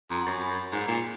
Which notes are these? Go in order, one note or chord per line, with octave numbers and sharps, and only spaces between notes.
F2 A#5
F#5
F#2 G#5
B5
G#2 A#5
A#2